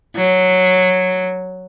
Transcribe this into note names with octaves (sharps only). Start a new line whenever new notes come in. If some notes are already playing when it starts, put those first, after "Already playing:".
F#3